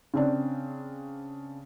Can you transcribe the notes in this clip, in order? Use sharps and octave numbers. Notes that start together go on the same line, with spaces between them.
C#3 C4 D4